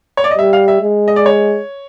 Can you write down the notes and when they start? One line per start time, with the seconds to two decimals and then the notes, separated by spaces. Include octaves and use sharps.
0.17 C#5
0.24 D5
0.31 D#5
0.38 G3 E5
0.53 F5
0.68 E5
0.82 G#3
1.08 D#5
1.16 D5
1.26 C#5